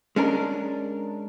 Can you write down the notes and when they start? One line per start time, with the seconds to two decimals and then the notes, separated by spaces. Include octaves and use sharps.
0.16 G#3 C#4 D4 A#4